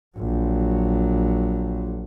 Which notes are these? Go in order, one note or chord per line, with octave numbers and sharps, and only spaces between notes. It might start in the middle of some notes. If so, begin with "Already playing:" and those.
A#1 F#3